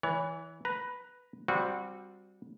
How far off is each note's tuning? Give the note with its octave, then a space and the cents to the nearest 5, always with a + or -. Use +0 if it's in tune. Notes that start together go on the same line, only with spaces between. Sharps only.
E3 -10 C#5 +35
B4 +0 A#5 +15
G3 +0 C4 +0 F#4 -25